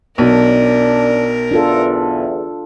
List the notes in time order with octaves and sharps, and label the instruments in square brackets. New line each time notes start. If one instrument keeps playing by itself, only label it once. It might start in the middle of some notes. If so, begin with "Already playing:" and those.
[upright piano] B1 [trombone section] F#2 D4 [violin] A#4
[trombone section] E2 [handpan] D4 F4 A4